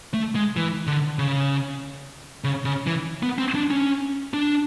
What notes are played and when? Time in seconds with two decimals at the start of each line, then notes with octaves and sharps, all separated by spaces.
0.14 A3
0.35 G#3
0.57 E3
0.87 D3
1.19 C#3
2.44 C#3
2.65 C#3
2.87 E3
3.23 B3
3.38 C4
3.55 D4
3.71 C#4
4.34 D4